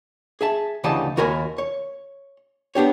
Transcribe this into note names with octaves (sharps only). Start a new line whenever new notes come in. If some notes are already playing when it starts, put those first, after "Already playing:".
G#4 E5 A5
D2 C#3 E3 G4 D#5 A5
D#2 F#4 A#4 G#5 B5
C#5
B3 D4 G4 C#5